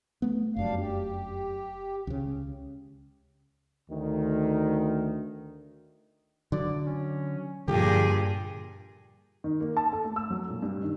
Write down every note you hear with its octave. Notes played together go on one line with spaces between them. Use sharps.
A3 B3
F1 F#2 G3 D4 F5
G4
C#2 C#3
D2 D#3
D3 F#3 D5
C#4
G2 A#2 D3 F3 G4 G#4
D#3
A#3
A5
A4
A3
E6
F#3
A#2
G2
D#3